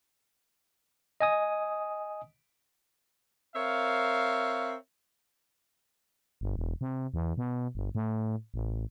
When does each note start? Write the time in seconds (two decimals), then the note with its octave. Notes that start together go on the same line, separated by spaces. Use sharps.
1.21 D#5 G#5 D#6
3.55 C4 A#4 C#5 E5 F5
6.41 G1
6.57 E1
6.81 C3
7.14 E2
7.37 B2
7.75 G1
7.95 A2
8.54 A1